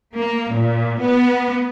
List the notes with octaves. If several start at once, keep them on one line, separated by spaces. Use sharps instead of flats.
A#3
A#2
B3